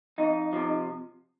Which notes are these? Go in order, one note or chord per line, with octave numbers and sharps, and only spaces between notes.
F2 D#4
C3 F3